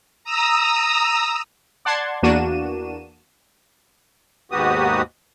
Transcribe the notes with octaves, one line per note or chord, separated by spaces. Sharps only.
A#5 D#6 E6
D5 F#5 A5 C6 G#6
E2 A#3 D4 F#4 D#7 E7
D#2 G#2 B3 F#4 G4 D#6